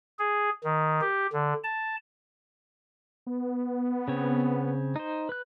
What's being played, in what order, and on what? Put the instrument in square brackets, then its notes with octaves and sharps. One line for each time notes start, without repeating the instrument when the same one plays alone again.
[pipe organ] G#4
D#3
G4
D3
A5
[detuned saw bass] B3
[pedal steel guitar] C#3 C4 C#5
D#4 C5
B4 F#6